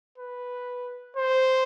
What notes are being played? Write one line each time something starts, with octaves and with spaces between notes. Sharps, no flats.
B4
C5